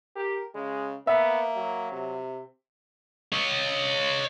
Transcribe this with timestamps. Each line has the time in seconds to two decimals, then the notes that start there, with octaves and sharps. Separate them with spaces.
0.16 G4 A#4
0.55 C#3 G#3
1.07 A#3 B3 E5
1.56 F#3
1.92 C3
3.33 C#5 D#5